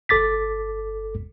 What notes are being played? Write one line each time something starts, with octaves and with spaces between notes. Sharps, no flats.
G1 A4 D6 A6 B6